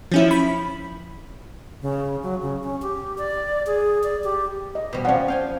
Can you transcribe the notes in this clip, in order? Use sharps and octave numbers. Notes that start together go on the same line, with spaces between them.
F3 C#4 E4
B5
C#3
F#3
C#3
C#4
G4
D5
G#4
D5
G4
D#5
B2 G3
F3 C4 C#4 D5 F#5
F5 G5 G#5